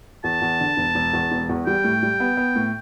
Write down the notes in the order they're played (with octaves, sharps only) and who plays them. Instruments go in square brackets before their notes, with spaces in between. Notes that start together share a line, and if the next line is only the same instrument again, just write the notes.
[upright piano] E2 [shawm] A5
[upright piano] E2
D3
E1
E1
E2
E1
E2
[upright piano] G3 [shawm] G5
[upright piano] A2
G3
B3
B3
A2